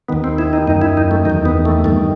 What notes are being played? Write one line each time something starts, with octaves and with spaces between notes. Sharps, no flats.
D#2 D#3 B3
C4
E4
D#4
F#2 D#3 D#4
E4
D#4
A3
E2 D#3 D#4
B3
A3
G2 D#3 A3